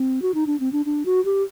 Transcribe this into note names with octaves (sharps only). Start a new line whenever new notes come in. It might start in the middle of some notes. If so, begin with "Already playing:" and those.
Already playing: C4
F#4
D#4
D4
C4
D4
D4
F#4
G4